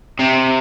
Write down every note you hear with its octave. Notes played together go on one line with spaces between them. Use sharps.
C3